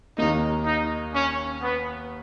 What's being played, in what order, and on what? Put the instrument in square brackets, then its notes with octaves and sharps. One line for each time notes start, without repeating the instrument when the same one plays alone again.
[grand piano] D#2 D#3 A#3 [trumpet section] D#4
[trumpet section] D#4
C#4
B3